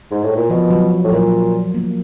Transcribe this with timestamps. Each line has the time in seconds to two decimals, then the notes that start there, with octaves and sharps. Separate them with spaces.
0.11 G#2
0.24 A2
0.36 A#2
0.50 B2 F3
0.70 F#3
1.04 A2
1.12 A#2 F#3
1.74 A#3